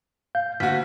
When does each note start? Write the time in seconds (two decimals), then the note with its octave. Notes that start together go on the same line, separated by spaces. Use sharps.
0.35 F5 G6
0.60 D2 A#3 F#4 B6